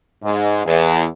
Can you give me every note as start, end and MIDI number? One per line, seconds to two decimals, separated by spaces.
0.23 0.64 44
0.65 1.05 40